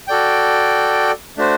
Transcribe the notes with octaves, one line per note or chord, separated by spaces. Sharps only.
F#4 A4 D5 G5
A3 D4 F#4 C5